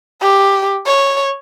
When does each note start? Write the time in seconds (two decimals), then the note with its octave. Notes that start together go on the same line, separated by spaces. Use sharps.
0.21 G4
0.86 C#5